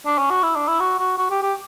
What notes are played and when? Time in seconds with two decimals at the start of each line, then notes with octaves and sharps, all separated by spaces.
0.06 D4
0.18 C#4
0.30 F#4
0.43 E4
0.55 D4
0.68 E4
0.80 F#4
0.98 F#4
1.18 F#4
1.30 G4
1.43 G4